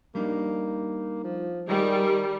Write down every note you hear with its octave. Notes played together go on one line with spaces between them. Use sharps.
G3 A#3 D4 D#4
F3
D#3 G3 G4 G#4 A#4